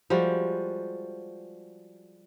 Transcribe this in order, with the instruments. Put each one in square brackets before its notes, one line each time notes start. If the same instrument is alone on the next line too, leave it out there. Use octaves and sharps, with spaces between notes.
[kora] F3 G3 G#3 F#4